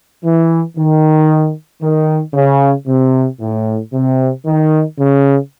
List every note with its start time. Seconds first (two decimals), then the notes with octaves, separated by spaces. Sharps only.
0.24 E3
0.77 D#3
1.81 D#3
2.34 C#3
2.87 C3
3.40 A2
3.93 C3
4.45 D#3
4.99 C#3